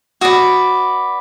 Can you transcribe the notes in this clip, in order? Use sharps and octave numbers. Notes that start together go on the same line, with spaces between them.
F#4 B4 D5 D#6